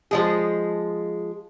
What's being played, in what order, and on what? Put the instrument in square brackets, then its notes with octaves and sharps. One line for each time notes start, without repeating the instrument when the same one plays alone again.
[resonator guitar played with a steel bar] F3 G#3 G#4